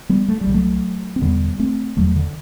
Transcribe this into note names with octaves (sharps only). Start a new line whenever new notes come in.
G3 B3
A3
G3
C2 C3
F#3 A3
C4
E1 E2 D3 G3 B3
A3 C4
E1 E2 D3 F#3 A3
D3